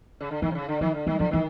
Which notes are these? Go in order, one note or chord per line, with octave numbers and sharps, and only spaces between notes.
C#3
D3
D#3 E3
C3
C#3
D3
D#3 F3
D3
D#3 G3
D3 F3
D#3 E3